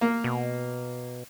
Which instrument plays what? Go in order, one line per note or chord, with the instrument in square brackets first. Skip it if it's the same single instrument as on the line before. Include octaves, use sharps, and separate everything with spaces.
[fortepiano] A#3
[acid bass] B2